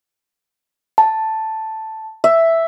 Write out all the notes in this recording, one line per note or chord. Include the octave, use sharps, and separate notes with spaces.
A5
E5